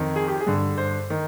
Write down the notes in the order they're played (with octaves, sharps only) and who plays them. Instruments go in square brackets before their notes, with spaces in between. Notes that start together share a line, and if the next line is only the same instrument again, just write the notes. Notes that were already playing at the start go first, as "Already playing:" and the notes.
Already playing: [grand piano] F2 D#3
G#4
G4
G#4
G2 D3
C5
D#3